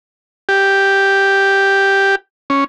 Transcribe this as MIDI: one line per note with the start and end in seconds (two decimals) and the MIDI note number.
0.49 2.15 67
2.50 2.64 61